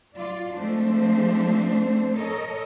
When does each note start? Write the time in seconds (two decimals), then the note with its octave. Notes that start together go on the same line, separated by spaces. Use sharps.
0.16 F#3 F4 D5
0.57 F3 G#3 A3 C4 D4 C5
2.15 A4 A#4 C#5 D#5